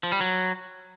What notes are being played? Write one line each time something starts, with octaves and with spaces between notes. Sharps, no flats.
F3
G3
F#3